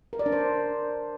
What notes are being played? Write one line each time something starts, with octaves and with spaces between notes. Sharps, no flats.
A#4
D5
D4
C5